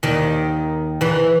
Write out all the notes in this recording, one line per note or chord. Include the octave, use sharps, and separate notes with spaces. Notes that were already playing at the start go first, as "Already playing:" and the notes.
D#2 D#3
E2 E3